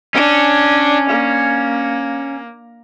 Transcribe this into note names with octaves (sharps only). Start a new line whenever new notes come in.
C#4 D4
A#3